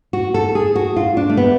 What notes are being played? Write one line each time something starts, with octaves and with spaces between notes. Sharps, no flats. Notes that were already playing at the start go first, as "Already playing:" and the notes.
F#4
A4
G#4
F#4
F4
D4
A3
B3